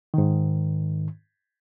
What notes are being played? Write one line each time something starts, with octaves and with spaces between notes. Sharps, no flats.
G#2 D#3